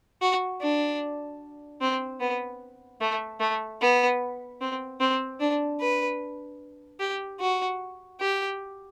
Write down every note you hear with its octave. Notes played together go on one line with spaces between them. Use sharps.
F#4
D4
C4
B3
A3
A3
B3
C4
C4
D4
B4
G4
F#4
G4